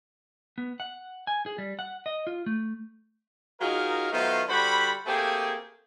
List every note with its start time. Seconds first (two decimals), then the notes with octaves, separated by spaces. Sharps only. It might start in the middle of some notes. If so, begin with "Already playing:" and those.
0.58 B3
0.80 F#5
1.27 G#5
1.46 G#4
1.58 G3
1.79 F#5
2.06 D#5
2.27 F4
2.46 A3
3.60 F#3 D#4 F4 G#4 A#4
4.12 D#3 F#3 A3 B3 F4 C5
4.47 D3 G3 F#4 C5 B5
5.06 A3 A#3 C4 G4 G#4